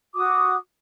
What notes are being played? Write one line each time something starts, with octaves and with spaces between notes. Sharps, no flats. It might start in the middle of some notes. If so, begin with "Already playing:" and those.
F#4 D6 D#6